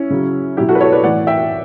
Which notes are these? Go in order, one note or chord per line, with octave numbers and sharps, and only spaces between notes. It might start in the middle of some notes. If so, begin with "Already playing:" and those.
Already playing: C#4 E4
C#3 F#3
B2 F#3 E4 G4
F#4 A4
B4
A4 C#5
B4 D5
A2 E3 D5 F#5
E5 G5